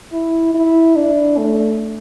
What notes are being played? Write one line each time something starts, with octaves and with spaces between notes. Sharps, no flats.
E4
E4
D4
A3